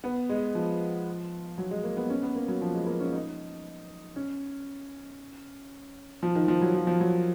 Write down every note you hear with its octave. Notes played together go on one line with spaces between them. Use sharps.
B3
G#3
F3
F#3
G#3
A#3
B3
C#4
B3
A#3
F#3
F3
G#3
A#3
C#4
D#4
C#4
F3
D#3
F3
F#3
F3
F3
F#3